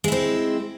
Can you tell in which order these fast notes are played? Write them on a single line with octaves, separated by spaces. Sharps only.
G#3 E4 C4